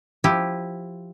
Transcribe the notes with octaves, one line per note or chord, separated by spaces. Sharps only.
F3 E4 G4